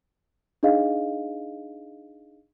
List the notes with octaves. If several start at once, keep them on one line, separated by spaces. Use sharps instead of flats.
D4 D#4 G#4 D#5 F5